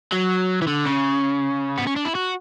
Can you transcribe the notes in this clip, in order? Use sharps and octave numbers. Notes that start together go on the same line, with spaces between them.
F#3
E3
D3
C#3
B3
C#4
D4
E4
F#4